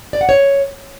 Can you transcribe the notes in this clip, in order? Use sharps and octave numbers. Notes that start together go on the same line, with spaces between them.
D5
F#5
C#5